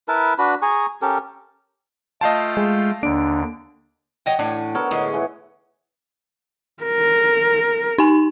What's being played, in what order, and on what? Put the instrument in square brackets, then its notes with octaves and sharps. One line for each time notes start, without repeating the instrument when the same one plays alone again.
[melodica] E4 A#4 B4 A5
D4 F#4 B4 B5
G#4 G#5 A#5 C#6
C#4 G4 A4 A#4
[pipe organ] A3 F4 G5 [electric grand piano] D#5 F5 A5
[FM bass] G#3
[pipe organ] D#2 D3 [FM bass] D4 [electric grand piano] D7
[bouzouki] F#3 D#5 G5 [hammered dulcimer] F#5
[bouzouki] A2 E3 C#4 [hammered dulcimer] D4
[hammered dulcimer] B3 A#4 C#5 [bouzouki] A4
[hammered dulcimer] A2 D#5 F#5 [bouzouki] D3 G#3 C#4
[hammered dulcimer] E3
[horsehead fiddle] A#4
[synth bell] D#4 G#5